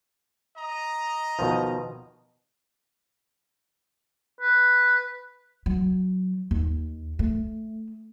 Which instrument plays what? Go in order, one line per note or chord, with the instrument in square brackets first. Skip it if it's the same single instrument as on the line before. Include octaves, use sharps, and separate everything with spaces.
[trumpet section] D#5 A#5
[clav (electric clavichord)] B2 D#3 F3
[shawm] B4
[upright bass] F#3
D#2
A3